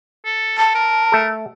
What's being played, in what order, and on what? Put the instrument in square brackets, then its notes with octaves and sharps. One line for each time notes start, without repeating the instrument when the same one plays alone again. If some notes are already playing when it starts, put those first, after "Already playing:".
[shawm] A4
[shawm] A4 [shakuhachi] A5
[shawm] A#4
[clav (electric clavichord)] A3 A4